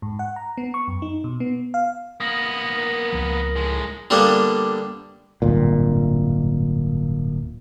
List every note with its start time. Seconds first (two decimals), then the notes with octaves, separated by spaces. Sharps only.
0.02 G#2
0.19 F#5
0.36 A#5
0.58 B3
0.74 C#6
0.88 F#2
1.02 D#4
1.24 B2
1.40 B3
1.74 F5
2.20 A#3 B3 D#6 A#6 F#7
2.78 A#4
3.12 C#2 F3
3.56 A2 G#3
4.10 D3 G3 A#3 B3 D4
5.42 D1 G1 A#2